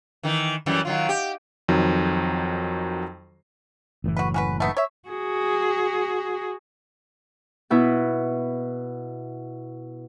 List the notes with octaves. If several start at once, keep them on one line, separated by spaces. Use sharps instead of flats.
D#3 E3
F#2 E3 G3
D#3 F#3 F4
G4
F2 D#3 F#3
F#1 A2 E3
F#4 B4
C#4 F#4 B4
A3 B3 D#4
C#5 E5
F#4 G#4
B2 E4 F#4